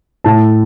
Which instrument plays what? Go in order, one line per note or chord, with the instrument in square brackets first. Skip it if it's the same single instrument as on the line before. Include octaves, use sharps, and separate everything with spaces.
[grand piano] A2 A5